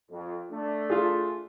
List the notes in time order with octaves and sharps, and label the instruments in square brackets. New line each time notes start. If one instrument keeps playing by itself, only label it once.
[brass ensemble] F2
A3 D4
[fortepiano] F4 G#4